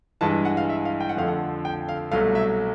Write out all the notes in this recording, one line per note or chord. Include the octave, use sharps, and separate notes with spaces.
G2 E3 G#3 A5
F#5
F5
E5
F5
G5
F#5
F2 D3 F3 A3 F5
F#5
G5
F5
C2 B2 F#3 A3 F5
E5